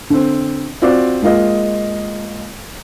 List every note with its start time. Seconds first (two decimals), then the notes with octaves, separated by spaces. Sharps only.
0.10 D3 C4
0.82 C4 F4 F#4 D5
1.22 G#3 A#3 F4 D#5